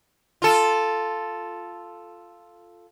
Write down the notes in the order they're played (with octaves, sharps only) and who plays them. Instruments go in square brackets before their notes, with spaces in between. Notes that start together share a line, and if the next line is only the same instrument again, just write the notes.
[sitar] F4 A4